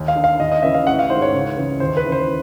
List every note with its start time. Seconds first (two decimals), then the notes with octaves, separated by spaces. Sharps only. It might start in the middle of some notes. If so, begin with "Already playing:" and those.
Already playing: D#2
0.08 F5
0.16 D3
0.24 F5
0.40 D#2 D#5
0.52 D#5
0.63 C#3 E3 E5
0.74 F5
0.86 A1 F#5
0.99 F5
1.10 D#3 C5
1.15 G#2
1.22 C#5
1.34 C#2
1.57 C#3 E3
1.80 D#2 C5
1.97 B4
2.04 C#3 E3
2.12 C5